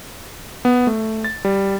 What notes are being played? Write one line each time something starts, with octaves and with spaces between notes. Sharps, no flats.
B3
A3
A6
G3